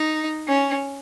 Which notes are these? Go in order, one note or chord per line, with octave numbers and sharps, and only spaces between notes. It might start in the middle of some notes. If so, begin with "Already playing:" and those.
Already playing: D#4
C#4